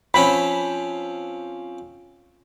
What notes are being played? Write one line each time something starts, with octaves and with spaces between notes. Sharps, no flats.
F3 C4 C#4 B5